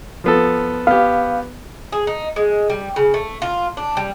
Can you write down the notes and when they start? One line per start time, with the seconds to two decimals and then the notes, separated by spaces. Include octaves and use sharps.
0.24 F3 B3 A4
0.87 B3 G4 F5
1.92 G#4
2.07 D#4
2.36 G#3
2.70 G3
2.96 C#3
3.14 A3
3.42 F4
3.77 D4
3.97 G3